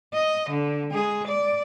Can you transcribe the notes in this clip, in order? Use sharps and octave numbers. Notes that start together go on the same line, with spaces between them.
D#5
D3
G#3 G#4
D5